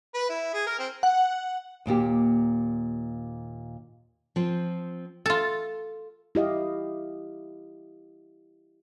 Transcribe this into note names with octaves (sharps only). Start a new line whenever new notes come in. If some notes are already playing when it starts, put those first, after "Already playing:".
B4
E4
G#4
A#4
C4
F#5
D#2 A#2 A#3 G4
F3 C4
F4 A4
E4 G4 D#5 F5